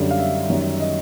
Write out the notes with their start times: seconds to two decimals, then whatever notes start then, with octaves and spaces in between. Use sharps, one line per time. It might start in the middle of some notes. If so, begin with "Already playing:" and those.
Already playing: F#2 D3 G3
0.11 F5
0.19 E5
0.49 F#2 D#3 G3
0.80 D#5